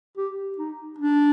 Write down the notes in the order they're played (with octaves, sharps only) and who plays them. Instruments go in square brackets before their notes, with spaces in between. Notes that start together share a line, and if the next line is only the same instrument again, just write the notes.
[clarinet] G4
D#4
D4